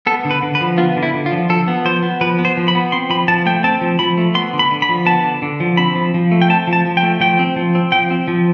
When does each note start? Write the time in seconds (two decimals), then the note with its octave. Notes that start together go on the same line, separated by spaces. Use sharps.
0.06 B3 A4
0.25 D3
0.31 B4
0.42 D3
0.55 B4
0.61 F3
0.78 B3 F4
0.97 D3
1.03 E4
1.14 D3
1.26 F4
1.32 F3
1.49 F3 A4
1.68 B3
1.85 F3 C5
2.03 B3
2.21 F3 B4
2.39 B3
2.45 C5
2.57 F3
2.68 B5
2.75 B3
2.92 C4 C6
3.10 F3 B5
3.28 F3 A5
3.46 A3 G5
3.64 C4 A5
3.81 F3
3.99 F3 B5
4.17 A3
4.35 B3 C6
4.53 D3
4.59 B5
4.71 D3
4.82 B5
4.89 F3
5.06 B3 A5
5.24 D3
5.42 D3
5.60 F3
5.77 C4 B5
5.95 F3
6.14 F3
6.31 A3
6.42 G5
6.50 C4 A5
6.67 F3
6.73 A5
6.85 F3
6.97 G5
7.03 A3
7.20 F3 G5
7.39 C4
7.56 F3
7.75 C4
7.92 F3 G5
8.11 C4
8.28 F3